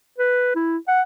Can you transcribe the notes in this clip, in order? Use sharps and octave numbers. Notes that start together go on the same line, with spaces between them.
B4
E4
F#5